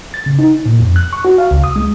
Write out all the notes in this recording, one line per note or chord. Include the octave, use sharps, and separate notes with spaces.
A6
C#3
D#4
A#2
F2
F#6
C#6
F#4
F5
C#2
D#6
G#3